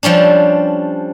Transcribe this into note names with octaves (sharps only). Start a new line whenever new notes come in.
F3 G3 C#4 D4